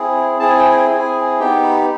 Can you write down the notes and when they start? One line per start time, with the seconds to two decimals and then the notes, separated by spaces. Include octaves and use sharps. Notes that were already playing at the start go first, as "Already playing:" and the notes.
Already playing: C4 E4 G#4
0.40 C4 E4 G#4 A5
0.50 G#5
0.59 G5
0.70 G#5
0.89 C4 E4 G#4
1.39 B3 D#4 G4 G5
1.64 B5